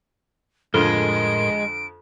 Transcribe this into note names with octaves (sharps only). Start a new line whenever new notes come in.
F2 A2 D3 G#3 F4 A#4 C6 D7